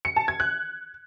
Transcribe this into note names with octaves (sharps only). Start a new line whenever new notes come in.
C#7
A5
G#6
F#6